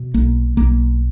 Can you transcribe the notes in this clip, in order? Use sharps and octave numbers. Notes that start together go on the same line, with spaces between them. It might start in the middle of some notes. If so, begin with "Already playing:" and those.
Already playing: B2
B1 A#3
B1 A#3